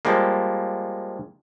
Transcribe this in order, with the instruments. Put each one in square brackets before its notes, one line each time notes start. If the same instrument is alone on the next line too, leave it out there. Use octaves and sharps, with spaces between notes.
[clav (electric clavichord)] F3 G3 G#3 A#3